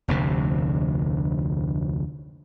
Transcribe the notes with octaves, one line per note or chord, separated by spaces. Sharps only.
F1 D2 C3